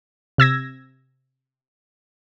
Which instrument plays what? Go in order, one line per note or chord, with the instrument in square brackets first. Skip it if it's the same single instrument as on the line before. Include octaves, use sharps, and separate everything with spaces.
[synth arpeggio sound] C3 E6 G#6 A#6